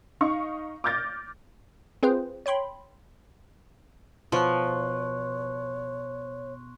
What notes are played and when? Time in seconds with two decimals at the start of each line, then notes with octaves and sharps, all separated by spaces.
0.21 D#4 F5 C#6
0.84 D6 F6 G6 A6 A#6
2.03 C4 F4 G#4 B4 C5
2.46 C#5 G5 B5 C6
4.32 B2 F3 C#5 C6 C#6 F#6